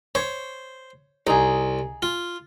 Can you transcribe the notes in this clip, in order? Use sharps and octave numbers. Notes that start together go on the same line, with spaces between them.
C5 C#5
C2 D#4 G#4
F4